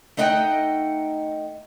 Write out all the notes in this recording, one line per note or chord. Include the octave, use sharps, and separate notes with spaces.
A3 D#4 D#5 E5 F#5 G5